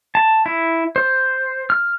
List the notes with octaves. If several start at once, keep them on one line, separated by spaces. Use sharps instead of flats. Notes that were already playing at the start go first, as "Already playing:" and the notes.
A5
E4
C5
F6